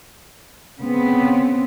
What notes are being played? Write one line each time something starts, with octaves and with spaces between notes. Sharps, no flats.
C#3 B3 C4